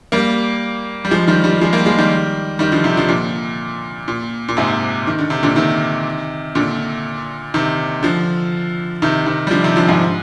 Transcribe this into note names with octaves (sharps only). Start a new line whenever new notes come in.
G3 A#3
G3
F3 G#3
D#3 G3
D#3 G3
F3 G#3
G3 A#3
F3 G#3
D#3 G3
D#3 G3
D3 F3
C3 D#3
D3 F3
A#2 D3
A#2
A#2
G#2 C3
D#3
D3
C3
A#2 D3
C3 D#3
A#2 D3
C3 D#3
D3 F3
C3 D#3
C3 D#3
G3
D3 F3
C3 D#3
D3 F3
G#2